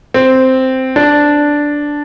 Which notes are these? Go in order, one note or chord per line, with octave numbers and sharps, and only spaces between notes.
C4
D4